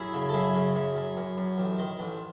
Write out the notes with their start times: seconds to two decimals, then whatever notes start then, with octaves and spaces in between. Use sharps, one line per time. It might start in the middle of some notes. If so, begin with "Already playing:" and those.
Already playing: F#2 E4 G#4
0.14 C#3
0.29 A4
0.33 F#2 E4 G#4
0.55 C#3
0.75 F#2
0.96 F#2
1.17 F#2
1.37 F#2
1.58 A1
1.78 D#3
1.99 A1